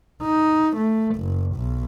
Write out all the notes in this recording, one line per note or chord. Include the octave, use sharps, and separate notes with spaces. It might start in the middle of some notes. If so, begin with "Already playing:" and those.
D#4
A3
F#1
B1